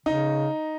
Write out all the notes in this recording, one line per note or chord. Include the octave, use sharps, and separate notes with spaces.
C#3 D#4